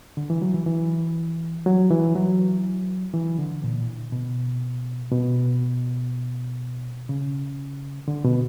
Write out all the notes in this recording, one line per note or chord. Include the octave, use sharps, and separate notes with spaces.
D3
E3
F#3
E3
E3
F#3
E3
F#3
E3
D3
A#2
B2
B2
C#3
D3
B2